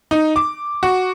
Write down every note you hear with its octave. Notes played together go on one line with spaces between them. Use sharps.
D#4
D6
F#4